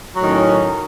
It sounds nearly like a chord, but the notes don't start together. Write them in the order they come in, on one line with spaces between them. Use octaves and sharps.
F#3 A2 D#3 C#4